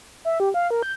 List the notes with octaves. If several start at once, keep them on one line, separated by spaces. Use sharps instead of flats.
E5
G4
F5
A#4
G6